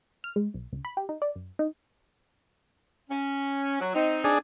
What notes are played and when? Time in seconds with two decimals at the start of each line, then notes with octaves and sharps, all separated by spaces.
0.24 F6
0.36 G#3
0.54 B1
0.73 C#2
0.85 B5
0.97 G4
1.09 D#4
1.22 D5
1.36 F#2
1.59 D#4
3.09 C#4
3.81 F#3
3.94 C4 D#4
4.24 D4 G#4